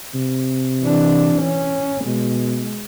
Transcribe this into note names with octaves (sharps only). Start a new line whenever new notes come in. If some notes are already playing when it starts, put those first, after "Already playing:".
C3
E3 D4
C#4
B2 G#3